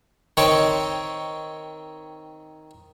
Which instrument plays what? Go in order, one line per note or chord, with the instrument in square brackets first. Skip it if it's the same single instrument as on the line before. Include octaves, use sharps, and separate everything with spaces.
[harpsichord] D#3 C4 C#5 G5